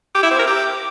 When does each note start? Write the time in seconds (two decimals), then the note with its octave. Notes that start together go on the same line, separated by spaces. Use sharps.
0.15 G4
0.23 E4
0.31 C4
0.39 A#4
0.47 G4